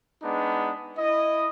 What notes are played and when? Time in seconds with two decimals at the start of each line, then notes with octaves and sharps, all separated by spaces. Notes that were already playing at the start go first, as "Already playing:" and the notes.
0.23 G#3 B3 D4 D#4
0.98 E4 D#5